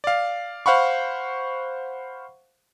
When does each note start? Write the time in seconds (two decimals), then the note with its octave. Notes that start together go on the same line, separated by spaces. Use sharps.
0.04 D5 F5
0.66 C5 F5 F#5 B5 C#6